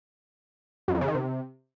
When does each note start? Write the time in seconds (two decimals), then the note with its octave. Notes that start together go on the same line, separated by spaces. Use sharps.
0.88 F#2
0.95 F2
1.01 C#3
1.08 D#3
1.14 C3